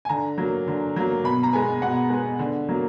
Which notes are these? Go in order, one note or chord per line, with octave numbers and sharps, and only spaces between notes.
G#5
D3 A#5
F#3 A#3
D3
F#3 A#3
B2 B5
A#5
G#3 B3 G#5
B2 F#5
G#3 B3
D3
F#3 A#3